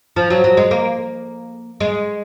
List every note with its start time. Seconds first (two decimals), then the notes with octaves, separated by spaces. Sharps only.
0.16 F3
0.30 F#3
0.44 F#3
0.57 G#3
0.71 A#3
1.80 G#3